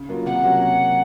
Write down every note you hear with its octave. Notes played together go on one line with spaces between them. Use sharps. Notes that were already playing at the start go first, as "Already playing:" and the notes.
Already playing: C#3
F#3 A#3 F4
C3 F#5
F#3 A#3 C#4 F#4